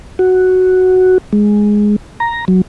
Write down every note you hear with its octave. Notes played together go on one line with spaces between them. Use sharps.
F#4
G#3
A#5
F#3